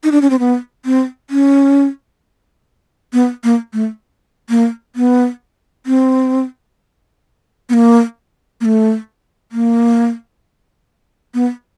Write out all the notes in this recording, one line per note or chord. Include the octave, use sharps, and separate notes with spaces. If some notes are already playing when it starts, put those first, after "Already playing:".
D#4
D4
C#4
C4
B3
C4
C#4
B3
A#3
A3
A#3
B3
C4
B3
A#3
A#3
A3
A#3
B3